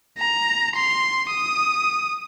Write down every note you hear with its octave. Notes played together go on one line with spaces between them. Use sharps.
A#5
C6
D#6